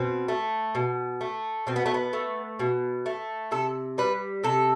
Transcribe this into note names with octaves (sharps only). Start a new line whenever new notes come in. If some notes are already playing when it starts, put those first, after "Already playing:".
Already playing: B2 C4
A3
B2
A3
B2 C4
B3
A3
B3
A3
B2
A3
C3 A4
G3 B4
C3 A4